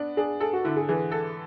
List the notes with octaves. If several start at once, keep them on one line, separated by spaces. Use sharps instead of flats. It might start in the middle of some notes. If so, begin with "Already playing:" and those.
Already playing: B3 D4
D4 G#4
G#4 A4
F#4
D3 E4
G#4
E3 G#4
A4